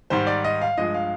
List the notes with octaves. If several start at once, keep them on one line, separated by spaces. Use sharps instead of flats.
G#2 D#3 G3 C5
D5
D#5
F5
G2 F3 G#3 D#5
F5